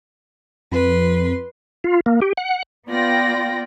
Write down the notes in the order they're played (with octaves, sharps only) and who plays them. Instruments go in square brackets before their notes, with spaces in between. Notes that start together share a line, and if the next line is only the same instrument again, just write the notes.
[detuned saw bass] F2 [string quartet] B4 C6
[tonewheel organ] F4
A#3
G4
F#5
[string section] B3 F4 D5 G5 A#6